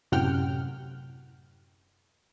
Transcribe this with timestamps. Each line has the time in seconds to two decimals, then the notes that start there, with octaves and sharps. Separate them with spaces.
0.12 F#2 A2 C3 F#5 G5 F6